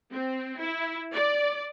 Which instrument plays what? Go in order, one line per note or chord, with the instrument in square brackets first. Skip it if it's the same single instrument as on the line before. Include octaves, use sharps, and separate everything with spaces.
[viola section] C4
E4
D5